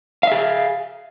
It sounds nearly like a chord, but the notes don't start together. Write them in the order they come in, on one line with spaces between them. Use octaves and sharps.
F5 E5 G#4